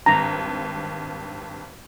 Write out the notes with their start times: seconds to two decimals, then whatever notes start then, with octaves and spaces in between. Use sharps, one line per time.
0.06 G#1 G2 A#5